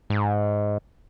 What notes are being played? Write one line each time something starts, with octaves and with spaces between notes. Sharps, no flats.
G#2